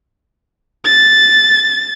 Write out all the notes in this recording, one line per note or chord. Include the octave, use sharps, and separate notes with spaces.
A6